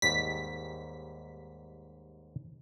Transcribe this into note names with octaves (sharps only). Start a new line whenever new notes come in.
D#2 G#2 G3 B6